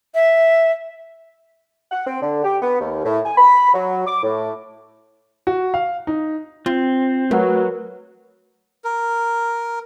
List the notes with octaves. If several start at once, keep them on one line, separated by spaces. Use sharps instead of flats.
E5
F#5
C4
D3
G4
B3
D#2
A2
G#5
B5
F#3
D6
A2
F#4
F5
D#4
C4 F4
F#3 A3 A#4 B4 F#5
A#4